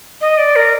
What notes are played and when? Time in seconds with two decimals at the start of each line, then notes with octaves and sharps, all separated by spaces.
0.21 D#5
0.38 D5
0.56 A#4